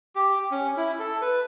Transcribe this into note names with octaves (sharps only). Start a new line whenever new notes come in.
G4
C#4
E4
A4
B4